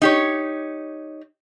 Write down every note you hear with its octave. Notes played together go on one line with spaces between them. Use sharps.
D#4 G4 C#5